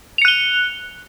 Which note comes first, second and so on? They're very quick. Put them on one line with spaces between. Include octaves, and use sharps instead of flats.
F7 C#7 F#6 G7